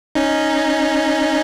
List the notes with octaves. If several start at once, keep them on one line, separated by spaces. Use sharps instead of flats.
C#4 D#4